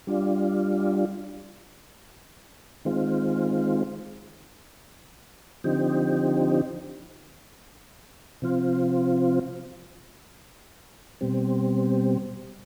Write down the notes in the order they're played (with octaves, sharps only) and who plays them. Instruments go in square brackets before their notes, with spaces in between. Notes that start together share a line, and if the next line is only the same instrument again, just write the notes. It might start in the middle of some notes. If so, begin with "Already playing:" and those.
[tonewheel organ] G3 D4 F4
D#3 G#3 C4 F4
D3 F3 C4 D#4 G4
C3 F3 C4 F4
B2 G3 C4